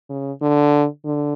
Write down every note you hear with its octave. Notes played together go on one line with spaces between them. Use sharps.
C#3
D3
D3